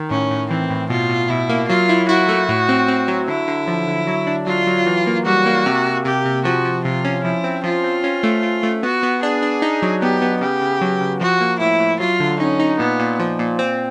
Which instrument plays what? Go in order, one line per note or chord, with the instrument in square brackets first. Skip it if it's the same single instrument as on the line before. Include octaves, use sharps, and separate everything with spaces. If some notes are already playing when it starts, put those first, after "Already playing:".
Already playing: [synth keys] D#3
[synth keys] A2 [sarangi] C#4
[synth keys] A2
[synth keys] E3 [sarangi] C4
[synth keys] A2
[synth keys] B2 [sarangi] F4
[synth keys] B2
[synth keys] B2 [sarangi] E4
[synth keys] A#3
[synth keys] F#3 [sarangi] F4
[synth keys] E4
[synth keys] E4 [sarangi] F#4
[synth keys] A3
A2
C4
C4
F#3
[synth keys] D3 [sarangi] E4
[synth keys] D3
F3
D3
F#3
D4
[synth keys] F#3 [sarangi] F4
[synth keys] F#3
E3
A#3
[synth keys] G3 [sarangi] F#4
[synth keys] A#3
C3
C3
[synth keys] C3 [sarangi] G4
[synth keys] C3
[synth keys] F3 [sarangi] F#4
[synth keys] F3
[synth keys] C3 [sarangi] F4
[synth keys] C#4
[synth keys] F3 [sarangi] E4
[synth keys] C4
[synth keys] F3 [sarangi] F4
[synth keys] C4
C#4
A3
A3
A3
[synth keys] B3 [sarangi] F#4
[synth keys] B3
[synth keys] D4 [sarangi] G#4
[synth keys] D4
D#4
F#3
[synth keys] B3 [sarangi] G4
[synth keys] B3
[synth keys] C#3 [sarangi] G4
[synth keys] C#3
F#3
C#3
[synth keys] F3 [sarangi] F#4
[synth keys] A#3
[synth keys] A2 [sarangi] E4
[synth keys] A2
[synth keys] F#3 [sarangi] F4
[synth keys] D3
[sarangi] C#4 [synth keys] D#4
[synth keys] D#4
[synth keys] A#2 [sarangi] B3
[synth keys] A#2
F3
A#2
C4